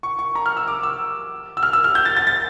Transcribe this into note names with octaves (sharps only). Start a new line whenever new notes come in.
C#6
C#6
A#5
F6
E6
D6
E6
E6
F6
E6
F6
G6
A6
A6
A6